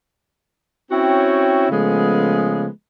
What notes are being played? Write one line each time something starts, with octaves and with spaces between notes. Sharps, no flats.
C4 C#4 E4 F#4 C#5 G5
C#3 F3 G#3 A3 B3